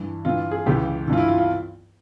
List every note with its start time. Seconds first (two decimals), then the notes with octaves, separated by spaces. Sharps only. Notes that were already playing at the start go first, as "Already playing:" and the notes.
Already playing: G2 E3
0.25 G2 E3 F4
0.51 G#4
0.66 C#2 C#3 E3 G4
1.08 G2 E3 F4
1.18 E4
1.28 F4
1.38 F4